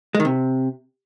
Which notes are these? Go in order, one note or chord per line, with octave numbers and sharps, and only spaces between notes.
G#3
D#3
C3